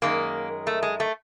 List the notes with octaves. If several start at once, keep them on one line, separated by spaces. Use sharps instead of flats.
F#2 D#3 G#3 A#3
A3
G#3
A3